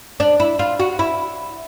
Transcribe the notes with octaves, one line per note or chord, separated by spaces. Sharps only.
D4
E4
F4
F#4
E4